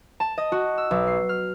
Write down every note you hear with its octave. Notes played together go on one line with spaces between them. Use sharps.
A5
D#5
F#4
E6
B1
C7
F6